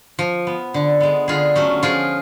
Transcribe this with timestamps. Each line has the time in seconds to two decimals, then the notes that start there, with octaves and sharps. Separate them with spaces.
0.19 F3
0.47 B3
0.74 D3
1.00 G#3 B3
1.28 D3 F4 G#4
1.55 F#3 A3 C#4
1.83 F3 F4 G#4